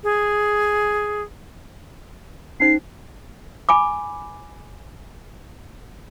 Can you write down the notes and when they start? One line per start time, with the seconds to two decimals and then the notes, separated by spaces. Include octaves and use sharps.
0.04 G#4
2.60 C#4 D#4 C5 C7
3.69 G#5 B5 D6